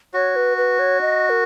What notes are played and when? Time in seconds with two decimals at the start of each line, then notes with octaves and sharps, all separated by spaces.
0.14 F#4 C#5
0.36 B4
0.57 B4
0.79 C#5
1.01 D#5
1.30 A#4